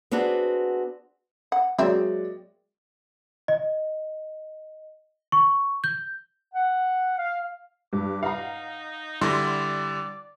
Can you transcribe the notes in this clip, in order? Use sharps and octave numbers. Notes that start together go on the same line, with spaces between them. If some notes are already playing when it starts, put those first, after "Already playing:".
B3 C4 D4 F#4 G#4
F#5
F#3 G#3 A#3 C4 D5 E5
D#5
C#6
G6
F#5
F5
G2 D6
D#4 F5 F#5 A#5
D3 G3 E4 D5 C6 A#6